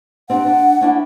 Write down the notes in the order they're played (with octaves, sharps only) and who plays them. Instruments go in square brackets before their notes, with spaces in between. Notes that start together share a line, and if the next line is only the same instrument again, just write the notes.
[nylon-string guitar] C4 D4 G4 [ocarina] F#5
[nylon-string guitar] D4
C#4 D4 E4